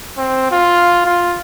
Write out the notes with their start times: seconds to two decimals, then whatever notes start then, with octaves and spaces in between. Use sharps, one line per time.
0.18 C4
0.52 F4
1.06 F4